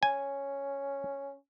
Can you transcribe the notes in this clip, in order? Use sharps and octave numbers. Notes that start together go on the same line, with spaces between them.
C#4 G#5